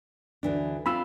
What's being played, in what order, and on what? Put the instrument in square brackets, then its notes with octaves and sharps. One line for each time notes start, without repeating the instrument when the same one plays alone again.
[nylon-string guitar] D2 E3 D4
[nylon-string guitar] C4 F4 [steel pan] B5 E6